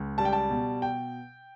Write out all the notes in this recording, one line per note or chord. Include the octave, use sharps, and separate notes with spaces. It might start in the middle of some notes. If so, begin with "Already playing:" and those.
Already playing: C#2
G3 A5
G5
A5
B2
G5